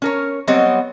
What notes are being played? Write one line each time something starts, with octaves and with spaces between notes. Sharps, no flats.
C#4 A#4 C#5
F#3 G3 B3 C4 C#5 D#5